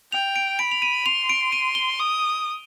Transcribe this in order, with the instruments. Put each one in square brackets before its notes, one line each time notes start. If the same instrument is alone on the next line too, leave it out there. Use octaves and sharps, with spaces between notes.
[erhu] G5 [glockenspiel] F7
[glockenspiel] D7
[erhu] B5 [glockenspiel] D7
[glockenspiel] F7
D#7
[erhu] C6 [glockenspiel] F7
[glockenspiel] D7
D#7
G7
[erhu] D#6